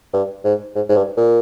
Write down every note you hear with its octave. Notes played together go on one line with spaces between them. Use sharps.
G2
G#2
G#2
G#2
G2
A#2